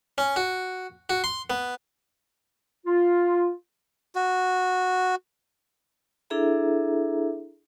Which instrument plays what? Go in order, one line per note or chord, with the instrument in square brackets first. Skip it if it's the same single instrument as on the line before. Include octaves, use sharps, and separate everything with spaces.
[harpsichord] C#4
F#4
F#4
C6
B3
[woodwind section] F4
[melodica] F#4
[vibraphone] D4 E4 G#4 A4 E5 A#5